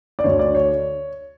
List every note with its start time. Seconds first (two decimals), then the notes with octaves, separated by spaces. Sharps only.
0.19 D5
0.24 D2 D3 C#5
0.39 D5
0.55 C#5